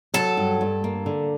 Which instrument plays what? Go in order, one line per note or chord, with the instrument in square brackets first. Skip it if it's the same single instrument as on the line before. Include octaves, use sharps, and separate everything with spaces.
[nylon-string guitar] F#3 [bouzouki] A4
[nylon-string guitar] G2
G2
A#3
D3